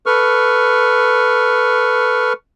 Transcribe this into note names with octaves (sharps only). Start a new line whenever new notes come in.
A4 B4 C#6 F6